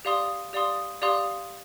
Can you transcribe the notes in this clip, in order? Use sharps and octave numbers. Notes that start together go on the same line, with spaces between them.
G4 D5 F5 C6 D#6
G4 D5 F5 C6 D#6
G4 D5 F5 C6 D#6